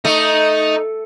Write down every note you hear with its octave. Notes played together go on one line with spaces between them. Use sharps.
A3 D#4